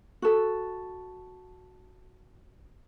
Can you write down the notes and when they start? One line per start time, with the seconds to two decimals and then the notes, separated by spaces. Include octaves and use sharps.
0.22 F#4 A4